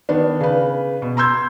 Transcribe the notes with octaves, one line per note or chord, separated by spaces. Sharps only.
D#3 B3 D4
C#3 B4
B2
A#5 C6 E6 G6 G#6